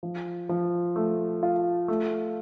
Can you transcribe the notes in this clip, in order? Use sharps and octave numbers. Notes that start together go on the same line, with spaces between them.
F3
F3
A3
F4
A3